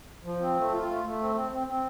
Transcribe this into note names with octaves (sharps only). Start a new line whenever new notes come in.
F3
C4
A3
F4
A3
A3
C4
C4
C4
C4